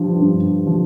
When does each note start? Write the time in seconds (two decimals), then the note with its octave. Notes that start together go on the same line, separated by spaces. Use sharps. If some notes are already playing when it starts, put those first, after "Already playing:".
Already playing: G2 F3
0.21 G2
0.67 F3